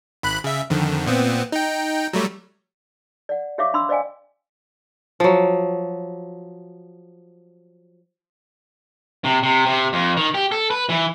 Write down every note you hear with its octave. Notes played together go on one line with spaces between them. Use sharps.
G#1 B5 F#6
C#3 E5
F2 D3 D#3
A#2 B3 C4
D#4 G5
F#3 G3 A3
D5 F#5
G4 C#5 E5 F5 C#6 D6
D4 B5 C6 E6
C5 D5 D#5 F5 G5 G#5
F3 F#3
C3
C3
C3
F2
D#3
G4
A4
B4
E3